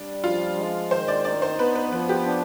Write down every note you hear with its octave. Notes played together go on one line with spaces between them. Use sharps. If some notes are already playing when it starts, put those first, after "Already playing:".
Already playing: G3 D4
F3 F4
G#3
D#3 C5
D5
D#4 D5
C5
B3 B4
B4
F3 B4
G4
D4